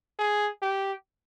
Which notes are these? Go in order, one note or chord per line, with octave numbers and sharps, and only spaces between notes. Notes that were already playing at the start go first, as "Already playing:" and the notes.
G#4
G4